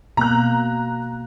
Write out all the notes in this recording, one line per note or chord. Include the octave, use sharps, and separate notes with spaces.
B2 A#3 A#5 F#6